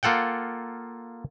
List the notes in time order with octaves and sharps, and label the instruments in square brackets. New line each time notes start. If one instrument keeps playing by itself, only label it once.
[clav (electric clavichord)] A#3 F4 A4 F#5 G5